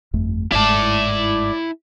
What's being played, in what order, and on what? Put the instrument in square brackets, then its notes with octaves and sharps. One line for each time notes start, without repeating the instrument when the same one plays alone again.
[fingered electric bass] G1 F2 A3
[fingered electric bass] G1 G#2 [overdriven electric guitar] E4 A5 [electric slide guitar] D5